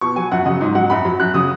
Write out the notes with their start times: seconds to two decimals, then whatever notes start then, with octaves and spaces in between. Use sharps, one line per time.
0.01 B2 C#6
0.16 F#3 G#5
0.31 F#2 F#5
0.46 C#3 F#3 D#5
0.61 G#2 D#5
0.75 F#3 F#5
0.90 F#2 B5
1.05 F#3
1.20 F#2 F#6
1.34 C#3 F#3 D#6